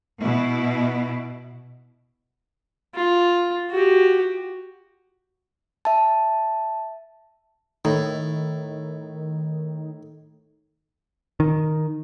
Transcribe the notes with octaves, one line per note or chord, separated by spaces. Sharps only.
B2 E4
F4
F#4 G4
E5 A5
A2 D#3
D#3